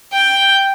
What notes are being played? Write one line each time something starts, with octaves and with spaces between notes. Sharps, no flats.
G5